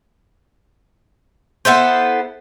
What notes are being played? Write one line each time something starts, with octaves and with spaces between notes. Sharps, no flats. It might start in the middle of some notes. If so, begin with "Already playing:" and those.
B3 E4 A4 C5